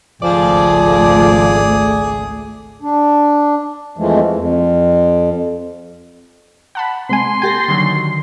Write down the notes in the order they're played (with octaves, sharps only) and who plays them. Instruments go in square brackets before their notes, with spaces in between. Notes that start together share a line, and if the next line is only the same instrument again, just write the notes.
[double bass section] G#1 C#2 A3 [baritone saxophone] F3 [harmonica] G#4 [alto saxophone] D5
[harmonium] D4
F2 E3 F3 G#3 A3
F2
[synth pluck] F#5 A5 B5
[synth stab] C3 G#3 G#5 [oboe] C6
[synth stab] A#3 G4 G#5 [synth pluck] G6 A6 A#6
[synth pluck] D3 D#3 F#3